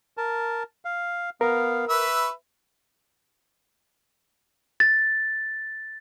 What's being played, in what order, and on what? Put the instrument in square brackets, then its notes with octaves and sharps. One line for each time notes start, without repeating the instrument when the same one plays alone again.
[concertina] A#4 A5
F5
[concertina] B3 F5 [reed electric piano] A#4
[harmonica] B4 E5 [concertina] C#6
[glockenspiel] A6